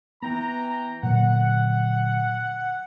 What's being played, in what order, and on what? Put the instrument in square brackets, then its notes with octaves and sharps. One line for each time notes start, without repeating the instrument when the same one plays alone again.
[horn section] E3 G5 A#5 [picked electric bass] B3
[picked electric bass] A#2 D3 F#3 [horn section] F#5